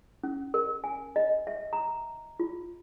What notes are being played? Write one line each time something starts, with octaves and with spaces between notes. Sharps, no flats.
C#4
A#4
G#5
D#5
E5
A#5
F4